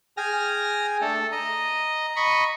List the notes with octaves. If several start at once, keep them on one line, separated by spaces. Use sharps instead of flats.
G#4 G5 G#5 F6 A#6
A3 D4 A4
D#5 A#5
D#5 B5 C#6